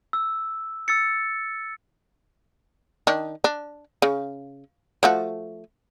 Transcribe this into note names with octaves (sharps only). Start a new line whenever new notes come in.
E6
E6 A6 C#7
D#3 D4
D4
C#3
F3 A3 F#4